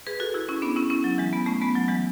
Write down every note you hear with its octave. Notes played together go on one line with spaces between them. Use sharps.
G#4 B4
F#4 A4
E4 G#4
C#4 E4
B3 D4
C#4 E4
C#4 E4
F#3
E3 G#3
G#3 B3
A3 C#4
G#3 B3
F#3
E3 G#3